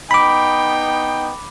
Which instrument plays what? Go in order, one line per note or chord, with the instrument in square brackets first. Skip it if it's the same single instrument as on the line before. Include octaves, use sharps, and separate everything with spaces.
[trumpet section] B3 D#4 G5 [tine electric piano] B5 D6